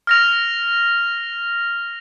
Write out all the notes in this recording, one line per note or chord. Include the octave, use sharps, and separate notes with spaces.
F6 A#6 F7